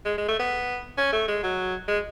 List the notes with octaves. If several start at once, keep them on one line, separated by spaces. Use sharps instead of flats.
G#3
G#3
A3
B3
C#4
A3
G#3
F#3
G#3